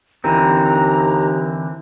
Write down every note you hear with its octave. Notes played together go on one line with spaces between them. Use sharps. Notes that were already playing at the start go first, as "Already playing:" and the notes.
D#2 D3 E3 C4 A#5